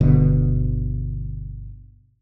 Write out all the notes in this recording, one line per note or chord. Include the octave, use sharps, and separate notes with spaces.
G1 B2 D3